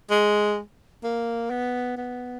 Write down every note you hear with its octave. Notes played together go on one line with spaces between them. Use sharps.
G#3
A#3
B3
B3